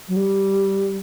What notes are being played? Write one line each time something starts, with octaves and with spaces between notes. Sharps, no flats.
F#3
G3